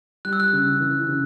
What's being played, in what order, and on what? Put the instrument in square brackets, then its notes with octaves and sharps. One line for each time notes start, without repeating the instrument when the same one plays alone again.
[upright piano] G3 [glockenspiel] F#6
[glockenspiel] E6
F#6
[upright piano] C#3
E3
C#3